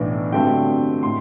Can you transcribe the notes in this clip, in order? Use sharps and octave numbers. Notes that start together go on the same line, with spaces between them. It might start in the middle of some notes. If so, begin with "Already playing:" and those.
Already playing: B1 A2 E3 B3 D4
G2 D3 F#3 A3 C4 G5
A2 C6